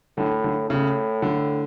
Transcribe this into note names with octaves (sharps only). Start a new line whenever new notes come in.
A2 D3
D3
A2 C#3
D3